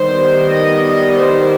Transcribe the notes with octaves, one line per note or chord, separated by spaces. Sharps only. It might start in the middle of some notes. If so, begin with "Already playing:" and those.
Already playing: D#3 G3 B3 C5
D#5
D#5
C5